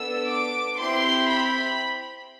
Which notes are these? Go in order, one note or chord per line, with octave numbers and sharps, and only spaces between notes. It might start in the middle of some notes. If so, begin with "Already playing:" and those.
Already playing: B3 D4 A4 E6
D6
C4 E4 G4 C6
B5